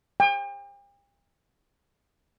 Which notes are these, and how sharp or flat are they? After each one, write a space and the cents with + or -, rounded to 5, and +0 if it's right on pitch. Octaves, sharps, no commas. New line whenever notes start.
G5 +40